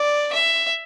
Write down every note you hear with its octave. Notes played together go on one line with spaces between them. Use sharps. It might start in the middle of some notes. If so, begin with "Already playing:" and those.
Already playing: D5
E5